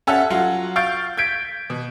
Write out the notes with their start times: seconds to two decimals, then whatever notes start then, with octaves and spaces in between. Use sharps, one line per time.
0.07 C#4 A4 E5 F#5
0.30 F#3 F4 F#4
0.76 F5 C#6 G6 A6 D7
1.17 G6 G#6 B6 D7
1.70 B2